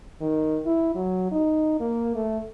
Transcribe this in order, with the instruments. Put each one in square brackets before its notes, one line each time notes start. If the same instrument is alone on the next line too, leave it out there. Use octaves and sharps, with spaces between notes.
[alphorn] D#3
E4
F#3
D#4
A#3
A3